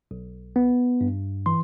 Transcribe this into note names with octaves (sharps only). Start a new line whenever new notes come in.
B1
B3
G2
E3 C6